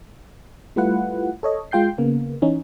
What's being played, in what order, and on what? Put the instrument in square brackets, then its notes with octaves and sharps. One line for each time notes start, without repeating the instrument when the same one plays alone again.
[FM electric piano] G3 A3 E4 F4 B4 F#5
A4 C#5 D#5
G#3 F4 G5 G6 C7
C#3 A#3 B3
E3 C#4 D#4